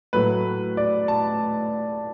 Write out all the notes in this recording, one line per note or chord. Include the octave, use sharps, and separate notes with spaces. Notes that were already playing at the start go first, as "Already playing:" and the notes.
A2 F#3 A3 B4
D5
A5